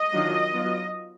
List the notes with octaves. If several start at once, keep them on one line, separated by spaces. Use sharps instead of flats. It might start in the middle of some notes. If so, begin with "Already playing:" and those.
Already playing: D#5
D#3 F#3 D4 F4
F#3 B3 F4